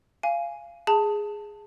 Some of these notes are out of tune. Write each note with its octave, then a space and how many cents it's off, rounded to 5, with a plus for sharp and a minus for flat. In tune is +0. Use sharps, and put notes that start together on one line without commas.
F5 -20 G#5 +0
G#4 +0 A5 +10